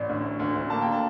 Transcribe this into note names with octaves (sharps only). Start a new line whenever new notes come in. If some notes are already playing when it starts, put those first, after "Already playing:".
Already playing: A1 D5
D2
D2
D2
D2
A#3 A5
D3 G5
A5